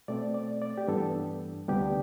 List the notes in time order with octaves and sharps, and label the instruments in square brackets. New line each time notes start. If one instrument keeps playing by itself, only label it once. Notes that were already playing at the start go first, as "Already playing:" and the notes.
[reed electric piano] B2 A3 C4 D5
D5
D5
G4
G2 E3 B3 D4 A4
D2 C3 G3 B3 D4 G4